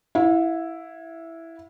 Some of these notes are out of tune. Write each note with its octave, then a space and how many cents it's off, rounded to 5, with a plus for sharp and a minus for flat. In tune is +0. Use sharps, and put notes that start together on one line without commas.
E4 +0 F5 +40